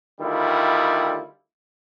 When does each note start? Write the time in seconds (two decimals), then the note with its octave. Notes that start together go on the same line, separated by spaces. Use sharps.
0.21 D2 D#3 G3 E4 F4